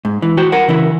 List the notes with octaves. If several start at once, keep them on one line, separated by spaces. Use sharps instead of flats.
G#2
E3
F#4 C5 G5
A#4 F#5
C#3 E3 E4 A#4